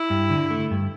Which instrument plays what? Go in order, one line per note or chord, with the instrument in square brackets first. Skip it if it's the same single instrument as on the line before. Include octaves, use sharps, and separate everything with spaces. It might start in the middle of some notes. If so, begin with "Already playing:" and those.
Already playing: [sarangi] E4
[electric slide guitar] G2
D3
A3
G2